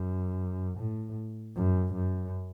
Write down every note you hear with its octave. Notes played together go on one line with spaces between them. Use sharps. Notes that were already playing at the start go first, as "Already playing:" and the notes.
Already playing: F#2
A2
F#2
F#2